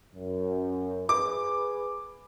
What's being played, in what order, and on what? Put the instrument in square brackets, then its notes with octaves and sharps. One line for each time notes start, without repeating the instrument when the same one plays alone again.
[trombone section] F#2
[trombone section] G#4 B4 [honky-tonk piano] D6